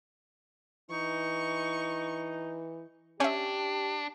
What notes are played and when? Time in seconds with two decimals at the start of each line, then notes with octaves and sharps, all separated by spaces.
0.91 E3 D#4 C#6
3.20 C#4 D4 G4 C#5 E5 G#5 G6